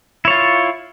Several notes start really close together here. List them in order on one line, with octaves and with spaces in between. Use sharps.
E4 C#5 F4